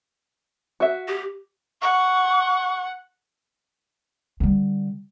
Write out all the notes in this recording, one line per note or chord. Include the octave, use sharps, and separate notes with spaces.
F#4 E5
G4
F#5 C#6
D3 G3